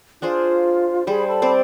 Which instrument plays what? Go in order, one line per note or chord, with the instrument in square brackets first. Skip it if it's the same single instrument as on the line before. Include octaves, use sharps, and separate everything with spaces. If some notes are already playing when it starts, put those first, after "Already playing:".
[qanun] D4 G#4 C5 [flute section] F4
[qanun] G3 C5 [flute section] G#4 B5
[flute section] A4 A5 B5
[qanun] C4 C5 D5